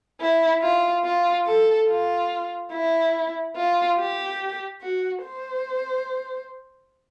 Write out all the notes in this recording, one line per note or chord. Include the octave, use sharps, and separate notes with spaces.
E4
F4
F4
A4
F4
E4
F4
G4
F#4
C5